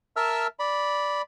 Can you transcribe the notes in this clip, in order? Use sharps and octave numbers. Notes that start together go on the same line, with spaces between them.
A#4 E5 A5 E6 F6
D5 B5